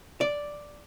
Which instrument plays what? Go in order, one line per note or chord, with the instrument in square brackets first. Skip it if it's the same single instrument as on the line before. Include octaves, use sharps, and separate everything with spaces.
[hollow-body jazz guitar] D5